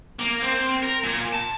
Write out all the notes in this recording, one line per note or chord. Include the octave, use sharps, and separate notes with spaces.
A#3
C4
A#4
A#2
A5